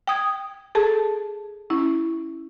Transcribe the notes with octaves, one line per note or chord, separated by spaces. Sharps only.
G5 D#6 G#6
G#4 A4 A5
C#4 E4